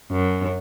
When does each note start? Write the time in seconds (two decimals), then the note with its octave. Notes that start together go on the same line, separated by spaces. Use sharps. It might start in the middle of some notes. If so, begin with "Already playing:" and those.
0.11 F#2